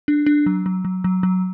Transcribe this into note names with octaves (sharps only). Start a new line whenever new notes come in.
D4
D4
F#3
F#3
F#3
F#3
F#3